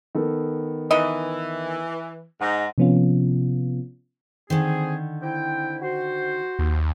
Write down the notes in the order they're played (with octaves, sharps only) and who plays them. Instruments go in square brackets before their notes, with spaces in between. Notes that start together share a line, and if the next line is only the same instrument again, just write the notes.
[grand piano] D#3 B3 A4
[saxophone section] E3 [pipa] D#4 E4 D#5
[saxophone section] G#2 D#4 [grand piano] F#5
[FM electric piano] C3 F3 B3 C#4 F4
[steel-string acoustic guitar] D3 D#3 [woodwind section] C4 G#4
[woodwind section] C4 E4 G5
F#4 C5
[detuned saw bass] D#2